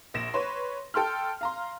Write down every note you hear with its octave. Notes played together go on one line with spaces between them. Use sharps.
A#1 A#6 E7
B4 C#5 C6
A4 G5 C6 F6
F5 A#5 C6